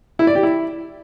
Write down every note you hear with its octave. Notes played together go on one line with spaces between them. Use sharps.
E4
D5
G4
E4